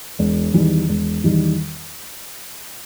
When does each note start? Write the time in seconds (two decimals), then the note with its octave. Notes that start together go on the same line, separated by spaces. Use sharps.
0.19 E1
0.54 E2 D#3 G3
0.89 E1
1.24 E2 D#3 G3